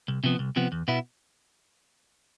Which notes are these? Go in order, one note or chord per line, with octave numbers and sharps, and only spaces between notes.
C2
C3 F3 B3
C2
C3 F3 B3
E2
B2 B3 E4